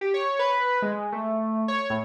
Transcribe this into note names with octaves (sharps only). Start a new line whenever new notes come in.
G4
C#5
B4
G#3
A3
C#5
A2